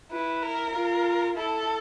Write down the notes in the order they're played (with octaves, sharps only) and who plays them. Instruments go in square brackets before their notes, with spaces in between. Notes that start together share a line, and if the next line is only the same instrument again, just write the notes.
[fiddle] E4 [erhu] B4
[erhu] A#4
[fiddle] F4
[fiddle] E4 [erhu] A4